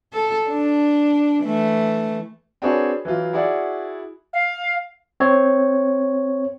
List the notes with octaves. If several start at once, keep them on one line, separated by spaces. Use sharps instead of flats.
A4
D4
E3 A3
C4 D4 F#4 G#4 B4 C#5
E3 F#3 F4
E4 F#4 G#4 D5 F#5
F5
C4 C#5